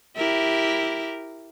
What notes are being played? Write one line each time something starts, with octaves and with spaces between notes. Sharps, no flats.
E4 G4 A#4